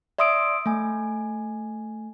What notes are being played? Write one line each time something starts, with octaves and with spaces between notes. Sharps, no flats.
D5 E5 C6 D#6 E6 D7
A3 G#5